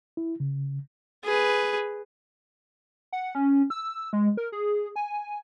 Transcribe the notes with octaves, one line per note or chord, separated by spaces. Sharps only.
E4
C#3
G#4 B4
F#5
C#4
E6
G#3
A#4
G#4
G#5